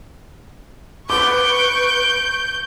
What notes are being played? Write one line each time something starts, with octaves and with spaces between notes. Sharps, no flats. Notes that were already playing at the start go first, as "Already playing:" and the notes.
B4 C#6 D6 G6 D7